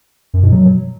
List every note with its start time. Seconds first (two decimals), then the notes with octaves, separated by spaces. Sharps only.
0.34 F#2
0.43 B2
0.52 F#3